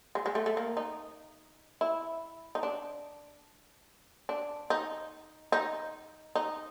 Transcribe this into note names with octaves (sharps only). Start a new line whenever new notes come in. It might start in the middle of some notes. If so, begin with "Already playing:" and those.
G#3
G#3
A3
A3
A#3
D#4
E4
D#4
D4
D4
D#4
D#4
D#4